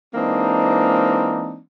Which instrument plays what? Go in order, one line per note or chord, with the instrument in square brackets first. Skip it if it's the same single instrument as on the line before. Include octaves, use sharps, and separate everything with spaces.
[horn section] E3 G#3 A#3 C4 D4 D#4